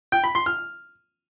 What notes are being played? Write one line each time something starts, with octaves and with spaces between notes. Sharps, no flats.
G5
B5
C6
F6